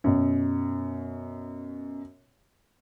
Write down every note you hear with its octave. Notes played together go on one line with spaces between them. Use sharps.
F#2 B2